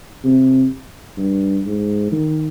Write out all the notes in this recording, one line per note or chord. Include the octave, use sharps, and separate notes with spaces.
C3
G2
G#2
D#3